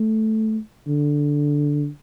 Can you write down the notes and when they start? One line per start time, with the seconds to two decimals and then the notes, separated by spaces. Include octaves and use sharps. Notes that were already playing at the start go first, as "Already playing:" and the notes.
Already playing: A3
0.87 D3